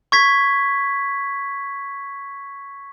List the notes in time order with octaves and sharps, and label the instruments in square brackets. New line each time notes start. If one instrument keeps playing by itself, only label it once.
[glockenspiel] C#6 G#6 B6